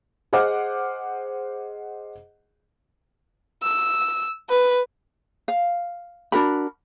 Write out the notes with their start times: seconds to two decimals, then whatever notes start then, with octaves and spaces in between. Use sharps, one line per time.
0.33 G#4 C5 D#5 F#5 D6 F6
3.63 E6
4.49 B4
5.48 F5
6.32 D4 F#4 A#4 B5